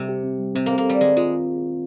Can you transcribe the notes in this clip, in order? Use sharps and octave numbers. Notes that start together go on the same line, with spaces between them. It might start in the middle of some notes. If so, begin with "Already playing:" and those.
Already playing: C3 G3
G4
C4
G3
C3 C4
A#3 C4
A#3
G3 C4
D#3 G#3
G#3 F4